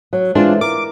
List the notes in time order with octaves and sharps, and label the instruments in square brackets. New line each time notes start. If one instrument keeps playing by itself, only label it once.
[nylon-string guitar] F#3
[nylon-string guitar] E3 G#3 C4 [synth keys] D4 F4
[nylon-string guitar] A#4 [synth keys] D6